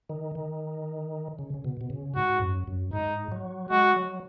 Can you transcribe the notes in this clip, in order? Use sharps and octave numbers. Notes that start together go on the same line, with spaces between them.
D#3
D#3
C#3
C#3
B2
B2
C#3
G#2 F#4
F#2
F#2
G#2 D#4
F#3
G#3 F#4
F#3